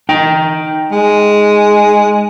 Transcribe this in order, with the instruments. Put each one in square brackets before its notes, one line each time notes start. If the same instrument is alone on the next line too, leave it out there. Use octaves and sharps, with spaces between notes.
[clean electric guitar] D#4 G5
[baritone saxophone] G#3